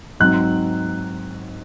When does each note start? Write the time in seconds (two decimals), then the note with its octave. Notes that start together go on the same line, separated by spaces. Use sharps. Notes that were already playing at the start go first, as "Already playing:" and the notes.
0.20 G#2 F#3 C4 F#6